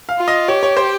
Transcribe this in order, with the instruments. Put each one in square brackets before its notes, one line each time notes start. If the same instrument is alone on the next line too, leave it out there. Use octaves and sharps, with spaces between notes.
[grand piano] F5
[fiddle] F4
[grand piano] D#5
[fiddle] G4 [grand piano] C#5
[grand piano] C#5
C5